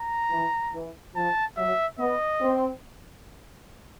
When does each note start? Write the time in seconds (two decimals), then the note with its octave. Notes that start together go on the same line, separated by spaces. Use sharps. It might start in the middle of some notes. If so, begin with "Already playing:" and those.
Already playing: A#5
0.31 E3
0.73 E3
1.15 F3 A5
1.57 F#3 E5
1.99 B3 D#5
2.41 C4